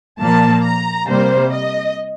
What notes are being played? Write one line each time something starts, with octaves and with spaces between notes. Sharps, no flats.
A#2 F3 A#3 A5
A#5
C3 G3 A#3 C5
D#5